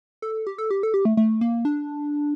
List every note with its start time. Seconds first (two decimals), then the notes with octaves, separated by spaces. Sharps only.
0.22 A4
0.47 G4
0.58 A4
0.70 G4
0.83 A4
0.94 G4
1.05 A3
1.17 A3
1.41 A#3
1.65 D4